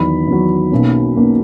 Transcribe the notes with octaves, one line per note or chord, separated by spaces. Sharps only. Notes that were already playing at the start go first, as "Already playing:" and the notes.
Already playing: E2 D#3 F#3 B5
E2 D#3 F#3
B1 B2 A#3 C#4
B1 B2 A#3 C#4